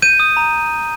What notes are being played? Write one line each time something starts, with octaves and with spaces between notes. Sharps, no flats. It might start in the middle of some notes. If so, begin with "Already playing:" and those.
G6 D#7
D#6
A#5